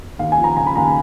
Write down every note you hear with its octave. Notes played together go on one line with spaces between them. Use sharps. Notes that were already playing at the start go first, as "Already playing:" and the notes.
D#2 F5
G#5
F3
A#5
C#3 A#5
B5
D#2 A#5